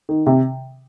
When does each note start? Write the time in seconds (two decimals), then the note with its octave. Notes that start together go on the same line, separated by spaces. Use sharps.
0.09 D#3
0.26 C3